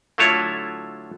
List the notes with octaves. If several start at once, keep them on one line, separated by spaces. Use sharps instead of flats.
D3 F#3 A3 E4 F4 C#5